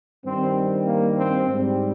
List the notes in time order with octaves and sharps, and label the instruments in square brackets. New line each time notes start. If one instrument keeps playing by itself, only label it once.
[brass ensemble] G2 D#3 G3 C4
C4
A#3
C4
G#2 G3 C4